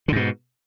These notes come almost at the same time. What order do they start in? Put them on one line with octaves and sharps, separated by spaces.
D3 G#2 B2